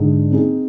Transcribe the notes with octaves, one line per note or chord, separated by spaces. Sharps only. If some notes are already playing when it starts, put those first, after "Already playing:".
Already playing: G#2 D3 G#3 D#4
C4 D#4 G#4